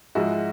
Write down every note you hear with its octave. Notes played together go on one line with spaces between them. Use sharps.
G#2 F3 G#3 E4 F#4